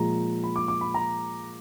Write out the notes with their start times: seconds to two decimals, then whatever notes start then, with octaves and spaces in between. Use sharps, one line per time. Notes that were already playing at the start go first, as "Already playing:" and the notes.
Already playing: A#2 F3 G#3 A#5
0.44 B5
0.56 D6
0.68 D6
0.81 B5
0.94 A#5